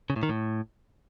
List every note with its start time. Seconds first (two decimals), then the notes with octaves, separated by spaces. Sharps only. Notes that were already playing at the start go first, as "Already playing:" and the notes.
0.10 C#3
0.16 A2
0.23 D#3
0.29 A2